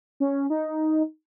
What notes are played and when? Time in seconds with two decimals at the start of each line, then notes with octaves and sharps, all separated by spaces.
0.20 C#4
0.50 D#4